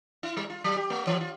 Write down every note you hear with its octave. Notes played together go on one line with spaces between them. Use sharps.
E4
G3
F4
F#3
G4
A3
E3
F4